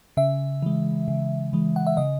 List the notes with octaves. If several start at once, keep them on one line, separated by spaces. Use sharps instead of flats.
C#3 E5
E3 G#3
C#3
E3 G#3
F#5
E5
C#3 D#5